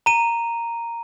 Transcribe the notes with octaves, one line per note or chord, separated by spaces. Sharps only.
A#5 D#7